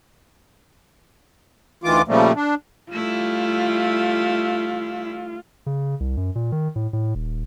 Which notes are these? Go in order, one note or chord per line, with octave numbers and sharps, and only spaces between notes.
D2 D#3 E3 F4 D6
A#2 C#3 F3 G3 A3 A#3
D4
G3 A3 E4 F4
C#3
C2
F#2
A#2
D#3
A2
A2
D#1